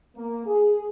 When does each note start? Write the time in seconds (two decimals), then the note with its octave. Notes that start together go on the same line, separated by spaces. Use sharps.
0.17 A#3
0.46 G#4